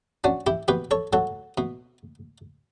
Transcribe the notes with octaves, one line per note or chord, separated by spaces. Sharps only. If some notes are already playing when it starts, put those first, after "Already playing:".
C#4 D4 F#4
E4 G4
B2 G4 B4
A4 C#5
F#3 F#4 A4
B2